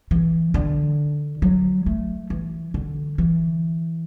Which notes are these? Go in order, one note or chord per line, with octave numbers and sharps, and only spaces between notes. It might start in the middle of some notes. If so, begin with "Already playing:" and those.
E3
D3
F#3
A3
E3
D3
E3